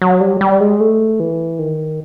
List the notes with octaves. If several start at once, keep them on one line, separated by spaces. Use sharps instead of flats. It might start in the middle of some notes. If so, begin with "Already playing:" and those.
F#3
G3
G3
G#3
A3
E3
D#3